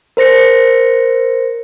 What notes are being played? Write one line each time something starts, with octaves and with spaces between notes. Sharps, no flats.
A#4 C5 A#6 C#7